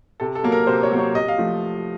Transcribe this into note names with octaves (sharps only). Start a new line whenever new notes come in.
C3 A4
A4
F#3 A#3
A#4
C3 C5
C#5
F#3 A#3
C#5
C3 D#5
F5
F3 A3